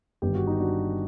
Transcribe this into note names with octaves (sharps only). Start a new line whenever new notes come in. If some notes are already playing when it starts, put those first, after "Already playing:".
G1 G2 D#3 G4
F#4
D#4
D4 F#4